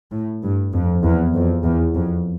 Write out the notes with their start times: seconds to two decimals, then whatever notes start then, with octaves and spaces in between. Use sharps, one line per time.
0.12 A2
0.43 G2
0.73 F2
1.04 E2
1.34 F2
1.64 E2
1.95 F2